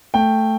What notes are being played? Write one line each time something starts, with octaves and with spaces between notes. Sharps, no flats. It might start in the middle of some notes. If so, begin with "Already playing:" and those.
A3 G5